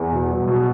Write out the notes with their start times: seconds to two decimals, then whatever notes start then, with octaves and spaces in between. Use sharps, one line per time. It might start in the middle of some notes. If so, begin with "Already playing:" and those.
Already playing: E2
0.12 B2
0.30 F#3
0.48 B2